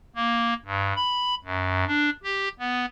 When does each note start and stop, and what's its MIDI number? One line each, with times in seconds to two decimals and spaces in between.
0.16 0.54 58
0.65 0.93 43
0.96 1.35 83
1.45 1.85 42
1.87 2.10 62
2.23 2.48 67
2.60 2.86 59